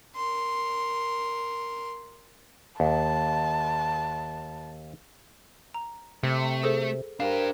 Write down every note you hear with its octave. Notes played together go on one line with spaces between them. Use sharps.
A#4 C6
D#2 A5
A#5
C3 A3
G#4 A4 C5
D4 G4 A#4 C5 F5